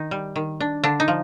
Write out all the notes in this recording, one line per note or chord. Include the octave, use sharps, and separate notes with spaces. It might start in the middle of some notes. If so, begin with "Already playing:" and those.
Already playing: D#3 D#4
G3
D#3
D4
D3 D4
D#4
F3